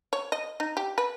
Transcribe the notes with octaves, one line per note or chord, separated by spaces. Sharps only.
C#5
D#5
D#4
G4
B4